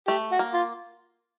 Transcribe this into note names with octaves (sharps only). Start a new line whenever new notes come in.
A3 G4
F#4
A#3
F4